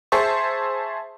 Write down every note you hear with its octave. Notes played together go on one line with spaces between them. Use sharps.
G#4 C5 E5 A5 C#6